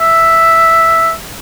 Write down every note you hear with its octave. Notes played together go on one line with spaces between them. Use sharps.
E5